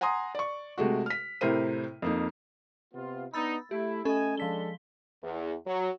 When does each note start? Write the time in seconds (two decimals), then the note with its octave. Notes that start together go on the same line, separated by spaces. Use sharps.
0.01 F#5 G#5 A#5 C6 D#6
0.35 D5 C#6
0.78 C3 G#3 A3 F#4
1.06 F6 B6
1.41 A2 C3 E4 A#4 C5 D#7
2.02 F2 A#3 D#4
2.94 C3 B3 F4
3.34 B3 D4 D#4 B5 E6 A6
3.71 A3 E4 G4
4.05 A3 C#4 A4 D#5 G#5 B5
4.37 F3 G#3 D4 A4 B6 G7
5.23 E2
5.67 F#3